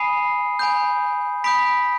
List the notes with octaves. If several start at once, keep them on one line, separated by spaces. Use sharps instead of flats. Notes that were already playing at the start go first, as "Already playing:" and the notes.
Already playing: G#5 B5 D#6 C7 D#7
G#5 B5 D#6 G6
B5 D#6 G6 B6 D7